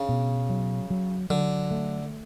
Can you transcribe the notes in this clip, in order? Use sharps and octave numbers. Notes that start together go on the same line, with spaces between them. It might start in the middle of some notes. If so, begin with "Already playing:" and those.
Already playing: C#3 D4
B2
F#3
F#3
D3 F#3
A3